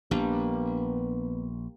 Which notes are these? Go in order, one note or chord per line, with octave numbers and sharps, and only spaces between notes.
A#1 G3 A#3 B3 D4